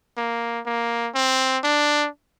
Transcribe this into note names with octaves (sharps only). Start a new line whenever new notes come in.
A#3
A#3
C4
D4